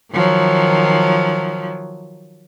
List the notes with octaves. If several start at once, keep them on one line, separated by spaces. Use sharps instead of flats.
D#3 F3 F#3